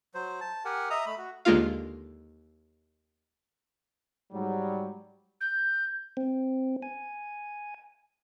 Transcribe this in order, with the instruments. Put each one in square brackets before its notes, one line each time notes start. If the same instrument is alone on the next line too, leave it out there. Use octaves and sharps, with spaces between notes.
[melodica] F#3 C5
A5
G4 A#4 F#5 G#5
D#5 E5 A#5 D#6
A3 B5
F#4
[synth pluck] D#2 D3 G#3 A#3 F4 F5
[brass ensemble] G#2 F#3 G3
[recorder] G6
[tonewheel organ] C4
G#5